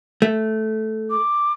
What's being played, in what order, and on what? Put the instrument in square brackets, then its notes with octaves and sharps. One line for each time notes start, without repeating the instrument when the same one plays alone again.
[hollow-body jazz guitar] A3
[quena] D6